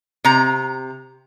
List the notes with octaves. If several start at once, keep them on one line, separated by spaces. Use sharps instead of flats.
C3 A#5